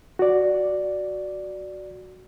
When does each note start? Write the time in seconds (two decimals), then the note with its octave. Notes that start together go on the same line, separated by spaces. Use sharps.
0.19 F#4 D5